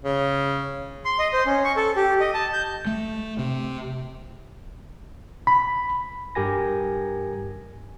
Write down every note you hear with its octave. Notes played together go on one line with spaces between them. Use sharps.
C#3
C6
D#5
C5
C#4
C#6
A4
G4
D#5
A5
G6
A3
C3
B5
G2 G4 A#4 G#5 A#6